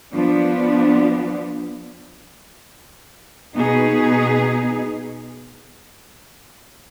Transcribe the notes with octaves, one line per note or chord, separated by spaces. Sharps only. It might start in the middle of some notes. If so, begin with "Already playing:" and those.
F3 B3 D4
B2 B3 D#4 G#4